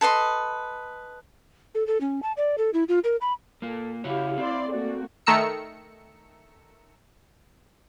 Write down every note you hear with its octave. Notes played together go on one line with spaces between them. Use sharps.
A4 B4 D#5 C6
A4
A4
C#4
A5
D5
A4
E4
F4
A#4
B5
A#3 F4 A4
C#3 E4 F#4 G4 C#5 F5
C4 E4 D5 C6
A3 A#3 F#4 D5
D#3 A3 A#5 E6 C#7